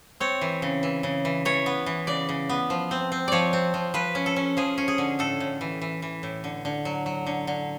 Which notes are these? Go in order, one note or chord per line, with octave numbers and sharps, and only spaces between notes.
C4 C#5
E3
C#3
E3
C#3
E3
E3 C#5
B3
E3
C#3 D5
C#3
B3
F3
C4
C4
F3 C#5 D5
C4
F3
F3 B4
C#4
A4
C#4
F3 G#4
C#4
G#4
D3
A2 A4
A2
E3
E3
E3
A2
D3
D3
F#3
F#3
D3
D3